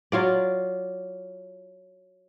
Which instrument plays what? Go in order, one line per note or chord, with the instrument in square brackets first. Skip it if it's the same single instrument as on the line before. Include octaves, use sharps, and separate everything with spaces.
[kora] F#3 F4 D5